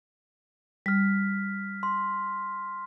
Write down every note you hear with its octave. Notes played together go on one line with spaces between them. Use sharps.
G3 F6 B6
C6